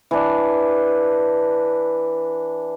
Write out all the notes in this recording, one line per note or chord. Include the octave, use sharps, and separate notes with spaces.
E3 D4